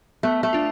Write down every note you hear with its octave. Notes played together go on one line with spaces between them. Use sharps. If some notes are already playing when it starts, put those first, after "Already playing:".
A3 B3
A3
D4 F4